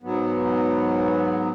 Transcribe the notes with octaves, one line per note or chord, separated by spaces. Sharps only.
G#2 F#3 B3